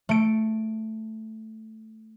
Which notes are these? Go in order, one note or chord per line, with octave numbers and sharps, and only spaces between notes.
A3 D7